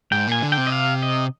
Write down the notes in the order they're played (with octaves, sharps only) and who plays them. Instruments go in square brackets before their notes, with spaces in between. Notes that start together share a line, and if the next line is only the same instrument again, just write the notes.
[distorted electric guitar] G#2 [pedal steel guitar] G5
[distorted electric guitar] A#2 [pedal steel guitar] G#5
[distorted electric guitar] D3
[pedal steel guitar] G5
[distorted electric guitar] C3
[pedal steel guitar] D#5
F5
D#5